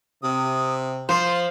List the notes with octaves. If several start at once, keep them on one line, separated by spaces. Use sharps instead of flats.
C3 D#6
F3 C5 C6